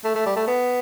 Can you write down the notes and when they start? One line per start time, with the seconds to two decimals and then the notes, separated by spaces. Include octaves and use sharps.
0.04 A3
0.15 A3
0.26 G3
0.36 A3
0.47 B3